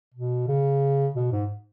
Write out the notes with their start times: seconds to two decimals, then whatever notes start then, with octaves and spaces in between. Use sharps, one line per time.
0.14 B2
0.48 C#3
1.16 B2
1.32 G#2